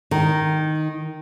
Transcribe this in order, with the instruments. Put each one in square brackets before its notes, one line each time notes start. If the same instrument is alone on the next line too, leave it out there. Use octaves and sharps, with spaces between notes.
[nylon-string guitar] D#3